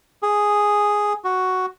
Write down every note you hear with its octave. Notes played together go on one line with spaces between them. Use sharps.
G#4
F#4